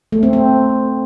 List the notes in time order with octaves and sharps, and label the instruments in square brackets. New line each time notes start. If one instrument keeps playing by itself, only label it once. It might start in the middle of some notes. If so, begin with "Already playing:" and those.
[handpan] A3
C4
C4